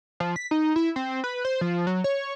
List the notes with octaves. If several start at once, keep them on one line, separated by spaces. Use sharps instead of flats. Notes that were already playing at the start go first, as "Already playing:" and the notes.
F3
B6
D#4
E4
C4
B4
C5
F3
F#3
C#5